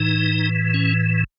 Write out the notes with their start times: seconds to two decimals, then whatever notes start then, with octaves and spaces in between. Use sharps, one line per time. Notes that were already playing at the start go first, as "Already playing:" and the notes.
Already playing: A2 E3 D#4
0.74 C#4